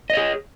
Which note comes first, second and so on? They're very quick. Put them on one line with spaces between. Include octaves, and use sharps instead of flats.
D#5 C#5 G#4